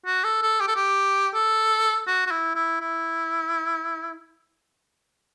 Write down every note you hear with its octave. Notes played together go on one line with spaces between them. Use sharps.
F#4
A4
A4
G4
A4
G4
A4
F#4
F#4
E4
E4
E4